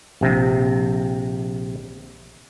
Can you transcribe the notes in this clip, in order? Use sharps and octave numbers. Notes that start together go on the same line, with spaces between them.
A#1 C3